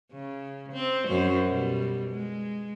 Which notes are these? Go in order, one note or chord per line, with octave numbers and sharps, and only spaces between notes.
C#3
C4
F#2 F#3 C5
B2 G3
G#3